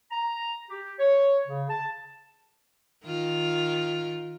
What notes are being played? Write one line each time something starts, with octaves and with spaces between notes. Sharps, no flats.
A#5
G4
C#5
C#3
A5
D#3 F4